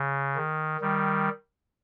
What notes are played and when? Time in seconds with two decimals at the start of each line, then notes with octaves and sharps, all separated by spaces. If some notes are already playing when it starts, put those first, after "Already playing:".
Already playing: C#3
0.36 D#3
0.81 D#3 G3